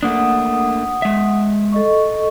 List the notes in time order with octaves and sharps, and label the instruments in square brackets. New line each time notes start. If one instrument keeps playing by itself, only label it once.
[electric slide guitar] A3 A#3 D4 [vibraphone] F#5 D#6
[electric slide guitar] G#3 E5
[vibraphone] A4 D#5 C#6